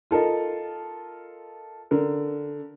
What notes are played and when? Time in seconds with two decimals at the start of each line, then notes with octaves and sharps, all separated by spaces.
0.11 F4 A4 A#4 D#5
1.91 D3 A#4